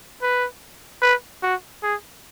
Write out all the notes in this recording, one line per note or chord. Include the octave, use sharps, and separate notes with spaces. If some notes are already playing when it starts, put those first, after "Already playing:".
B4
B4
F#4
G#4